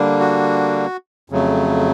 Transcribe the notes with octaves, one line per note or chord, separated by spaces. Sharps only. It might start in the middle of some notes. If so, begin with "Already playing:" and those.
Already playing: D3 G3 A#3 D4
F#4
F2 C#3 F#3 A3